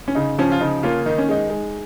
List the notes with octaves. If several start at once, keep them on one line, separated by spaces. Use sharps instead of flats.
C#4
C#3 D#4
F3 C#4
F4
C#3 D#4
A#3 C#4 F4
D#3 D#4
C#4
G#3 D#4
G#3